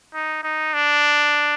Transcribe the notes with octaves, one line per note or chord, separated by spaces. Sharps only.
D#4
D#4
D4